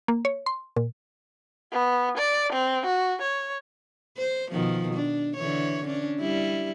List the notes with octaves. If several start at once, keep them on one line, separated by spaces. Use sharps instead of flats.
A#3
C#5
C6
A#2
B3
D5
C4
F#4
C#5
C5
B2 D#3 F3
D4
D3 E3 C#5
C#4 D4
G3 E4